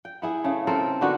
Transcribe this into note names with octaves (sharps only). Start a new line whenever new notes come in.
G5
B3 E4 G#4
C#3 A3
C4 A4 A#4
D3 D#3 B3 F#4